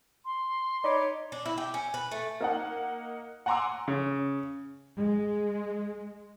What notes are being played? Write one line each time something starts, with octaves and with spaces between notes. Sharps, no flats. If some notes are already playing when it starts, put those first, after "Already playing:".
C6
D#4 C#5 D5 B5 D6
D4
E4
G4
C#4
B4
A3
A#3 D#4 F#5
F#5 G#5 A#5 C6 D6 E6
C#3
G#3